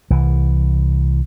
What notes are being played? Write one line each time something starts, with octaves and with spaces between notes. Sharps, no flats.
C2 E3